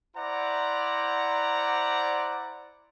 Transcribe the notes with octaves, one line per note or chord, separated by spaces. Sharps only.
E4 C5 D5 F#5 A#5